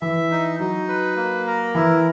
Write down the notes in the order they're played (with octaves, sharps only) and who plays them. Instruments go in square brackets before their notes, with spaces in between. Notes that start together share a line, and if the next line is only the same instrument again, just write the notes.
[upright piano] E3 [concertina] E5
[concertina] D#4
[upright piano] F#3 [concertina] D#4
[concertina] B4
A#3
A#4
[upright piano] E3 [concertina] E4